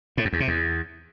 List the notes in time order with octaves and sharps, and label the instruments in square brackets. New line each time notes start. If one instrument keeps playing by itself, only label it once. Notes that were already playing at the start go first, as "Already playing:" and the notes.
[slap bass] A2
F#2
E2
C3
E2